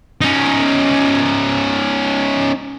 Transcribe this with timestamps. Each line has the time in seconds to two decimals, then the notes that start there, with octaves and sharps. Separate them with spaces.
0.21 C#4 D#4